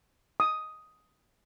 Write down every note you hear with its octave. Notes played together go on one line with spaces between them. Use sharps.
D#6